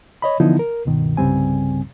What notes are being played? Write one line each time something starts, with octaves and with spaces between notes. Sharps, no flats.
C#5 D#5 B5
D3 E3 F3 B3 D#4 E4
A#4
C#2 G2 B2 D#3
C2 G2 C#3 G3 C4 G#5